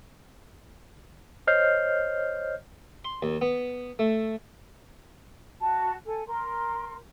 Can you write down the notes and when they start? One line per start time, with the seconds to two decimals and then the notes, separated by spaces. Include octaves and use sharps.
1.47 C5 C#5 D#5 F6 G6 C7
3.05 C6
3.23 D#2
3.41 B3
3.99 A3
5.60 F#4 A5
6.05 A4 G#5
6.26 A#4 C6